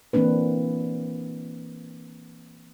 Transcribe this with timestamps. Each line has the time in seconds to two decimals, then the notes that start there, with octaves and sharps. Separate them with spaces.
0.13 E3 A#3 C4 D4 B4